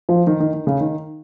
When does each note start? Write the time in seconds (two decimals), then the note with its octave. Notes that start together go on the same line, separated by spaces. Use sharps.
0.09 F3
0.27 D#3
0.40 D#3
0.54 D#3
0.67 C#3
0.81 D#3